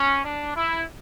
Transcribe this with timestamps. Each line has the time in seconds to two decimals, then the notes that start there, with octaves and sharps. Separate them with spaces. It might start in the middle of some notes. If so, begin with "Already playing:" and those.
Already playing: C#4
0.25 D4
0.56 E4